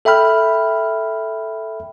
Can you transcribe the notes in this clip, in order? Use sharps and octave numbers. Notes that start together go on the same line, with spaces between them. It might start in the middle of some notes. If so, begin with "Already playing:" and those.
A4 E5 G5 B5 F6